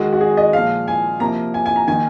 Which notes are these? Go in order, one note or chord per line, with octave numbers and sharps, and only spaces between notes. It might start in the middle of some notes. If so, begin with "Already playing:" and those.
Already playing: D#3 G#3 F#4
F#4
G#4
D#5
A#2 F3 G#3 F5
G#5
C3 F3 A#3 A#5
G#5
G#5
A#5
D#3 A#3 G#5